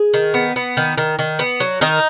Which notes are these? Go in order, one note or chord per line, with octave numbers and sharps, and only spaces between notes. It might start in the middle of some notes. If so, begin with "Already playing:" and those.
Already playing: G#4
D#3
B3
B3
D#3
D#3
D#3
B3
F#3
D#3 D#4